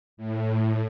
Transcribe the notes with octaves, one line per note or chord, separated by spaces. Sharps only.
A2